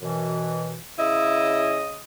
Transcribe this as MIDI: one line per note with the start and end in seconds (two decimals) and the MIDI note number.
0.01 0.78 42
0.01 0.78 47
0.01 0.78 52
0.99 2.01 49
0.99 1.77 64
0.99 2.01 75
0.99 2.01 87